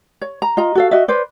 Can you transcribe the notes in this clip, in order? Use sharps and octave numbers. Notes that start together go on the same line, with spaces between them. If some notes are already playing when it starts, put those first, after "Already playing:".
C#5
A#5
F4 D#5 A#5
F#4 A4 F5
F#4 D#5 E5
B4 C5 D5